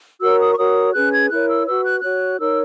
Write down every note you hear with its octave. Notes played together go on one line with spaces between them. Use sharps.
F#4 A#4 C#5 E6
D#6
C#6
F#4 A#4 C#5 D#6
C#4 G#4 B4 F#6
G#6
E4 A#4 C#5 F#6
E6
F#4 B4 E6
F#6
F#4 C#5 F#6
D#4 A#4 C#5 E6